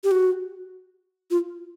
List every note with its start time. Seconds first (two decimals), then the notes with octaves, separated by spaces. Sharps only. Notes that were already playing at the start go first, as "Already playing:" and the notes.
0.04 G4
0.11 F#4
1.31 F4